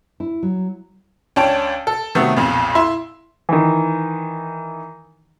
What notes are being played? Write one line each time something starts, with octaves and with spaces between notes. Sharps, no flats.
E4
F#3
C#2 D4 C#5 G5 A5 D7
A4
C3 D#3 F#3 A3 B3
B1 F2 A#2
E4 E5 C6
D#3 E3